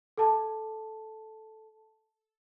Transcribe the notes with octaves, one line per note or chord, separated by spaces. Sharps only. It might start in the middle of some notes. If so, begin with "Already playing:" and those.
A4 A5